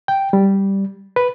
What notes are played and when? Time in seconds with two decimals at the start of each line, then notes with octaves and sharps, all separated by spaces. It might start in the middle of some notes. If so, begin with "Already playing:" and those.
0.08 G5
0.33 G3
1.16 B4